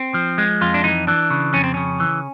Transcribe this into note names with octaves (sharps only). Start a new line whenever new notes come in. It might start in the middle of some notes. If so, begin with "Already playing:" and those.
Already playing: C4
F3
G#3
F2 F4
D4
E3 D#4
E3 D4
C#3
F2 C#4
C4
C#3 C#4
E3